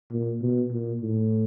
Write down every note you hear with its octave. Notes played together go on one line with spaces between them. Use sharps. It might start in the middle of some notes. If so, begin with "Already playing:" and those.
A#2
B2
A#2
A2